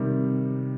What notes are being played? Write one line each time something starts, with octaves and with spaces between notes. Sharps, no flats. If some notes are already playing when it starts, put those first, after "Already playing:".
Already playing: C3 D#3 G3